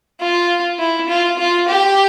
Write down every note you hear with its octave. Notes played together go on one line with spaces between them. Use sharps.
F4
E4
F4
F4
G4